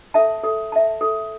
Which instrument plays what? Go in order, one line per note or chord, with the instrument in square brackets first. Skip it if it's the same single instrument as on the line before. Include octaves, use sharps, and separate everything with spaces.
[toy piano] A4 E5 A5
A4
E5 A5
A4